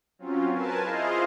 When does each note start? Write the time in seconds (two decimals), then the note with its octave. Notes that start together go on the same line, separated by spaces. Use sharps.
0.19 F#3 C4 C#4 F4
0.49 A#4 B4 G#5 A5
0.81 E4 F4 G#4 C5 D#5 F5